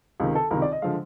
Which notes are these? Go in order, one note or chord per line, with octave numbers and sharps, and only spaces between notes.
C#2 C3 D#3
A4
C#2 C3 D#3 A#4
D5
D#5
D3 F3 G#3 F5